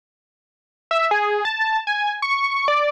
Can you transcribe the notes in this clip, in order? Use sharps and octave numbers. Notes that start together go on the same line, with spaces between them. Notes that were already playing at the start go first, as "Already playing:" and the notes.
E5
G#4
A5
G#5
C#6
D5